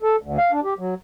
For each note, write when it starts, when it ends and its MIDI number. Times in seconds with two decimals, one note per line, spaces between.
0.02 0.16 69
0.21 0.37 38
0.38 0.51 77
0.52 0.60 62
0.64 0.74 67
0.78 0.94 54